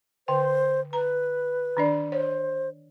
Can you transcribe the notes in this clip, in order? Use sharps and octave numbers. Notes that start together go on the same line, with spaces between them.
D3 C5 G5
B4 A#5
D#3 D4 D5
C5 C#5